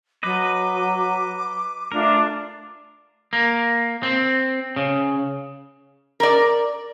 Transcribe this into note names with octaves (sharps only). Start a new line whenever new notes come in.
F#3 B4 D#5 D6
A3 D4 F4 A#4
A#3
C4
C#3
A#4 D5